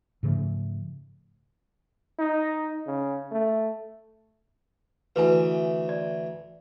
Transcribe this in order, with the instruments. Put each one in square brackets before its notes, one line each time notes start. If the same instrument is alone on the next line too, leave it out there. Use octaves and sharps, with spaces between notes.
[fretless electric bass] G#2 C#3 F3 A3
[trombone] D#4
C#3
A3
[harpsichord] D2 E3 [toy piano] B4 G#5
[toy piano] D5